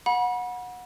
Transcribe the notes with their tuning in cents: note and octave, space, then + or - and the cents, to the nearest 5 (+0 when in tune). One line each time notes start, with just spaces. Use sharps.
F#5 -25 B5 -35